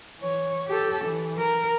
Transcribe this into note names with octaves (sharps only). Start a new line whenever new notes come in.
E3 C#5
G4 A4
E3
A#4